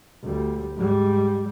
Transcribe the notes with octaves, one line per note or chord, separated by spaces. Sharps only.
D2 G3
G#2 G3